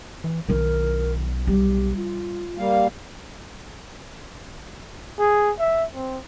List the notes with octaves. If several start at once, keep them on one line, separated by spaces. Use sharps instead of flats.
E3
B1 D#3 E4 A#4
G3 G4
F4
G3 A#3 F5
G#4
E5
C4